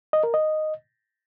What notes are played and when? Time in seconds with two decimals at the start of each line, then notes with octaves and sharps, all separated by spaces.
0.13 D#5
0.23 A#4
0.34 D#5